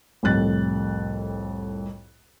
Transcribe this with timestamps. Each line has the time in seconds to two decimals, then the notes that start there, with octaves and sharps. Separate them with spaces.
0.23 C2 F2 A2 F#6 A6